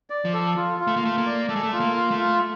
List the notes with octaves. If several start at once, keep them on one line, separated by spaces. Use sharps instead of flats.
D5
F3
A4
F4
F4
A3
A#3
A3 F4
A#3
D5
A3 A4
G#3
A3
F4
A#3
F4
A3
F4